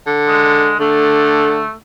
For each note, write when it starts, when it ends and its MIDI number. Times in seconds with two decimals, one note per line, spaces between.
0.06 0.74 50
0.28 0.78 56
0.80 1.62 50
0.80 1.73 57